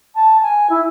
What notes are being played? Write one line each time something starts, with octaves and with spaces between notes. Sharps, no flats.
A5
G#5
E4